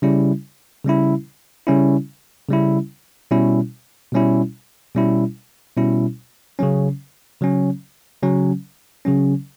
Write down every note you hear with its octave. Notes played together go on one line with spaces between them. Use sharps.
C#3 G3 C#4 E4
C#3 G3 C#4 E4
C#3 G3 C#4 E4
C#3 G3 C#4 E4
B2 G3 C#4 E4
B2 G3 C#4 E4
B2 G3 C#4 E4
B2 G3 C#4 E4
C#3 F#3 C#4
C#3 F#3 C#4
C#3 F#3 C#4
C#3 F#3 C#4